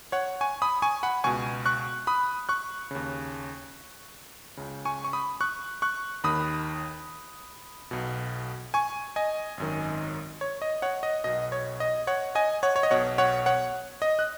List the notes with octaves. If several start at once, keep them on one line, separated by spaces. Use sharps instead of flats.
C#5 F#5
G#5 C#6
B5 D#6
G#5 C#6
F#5 B5
C#2 B2 G#5 C#6
C#6 F#6
B5 D#6
C#6 F#6
D#2 C#3
C#2 C#3
G#5 C#6
C#6
B5 D#6
C#6 F#6
C#6 F#6
D#2 D#3 B5 D#6
B1 B2
G#5 C#6
D#5 G#5
G#1 F#2 D#3
C#5
D#5
C#5 F#5
D#5
B1 B2 D#5
C#5
D#5
C#5 F#5
D#5 G#5
C#5 F#5
C#5
D#5
B1 B2 C#5 F#5
C#5 F#5
C#5 F#5
D#5
F#6